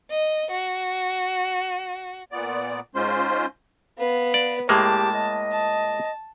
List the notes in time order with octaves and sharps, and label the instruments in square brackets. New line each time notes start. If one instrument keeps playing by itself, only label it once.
[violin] D#5
F#4
[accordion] A#2 B3 D5
G#2 G#3 C#4 F4 C5 C6
[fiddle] B3 B4 [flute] F5
[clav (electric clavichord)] D5
[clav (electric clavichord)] A2 G#3 A#3 [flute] G4 [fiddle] A5
[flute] D#5
[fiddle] A5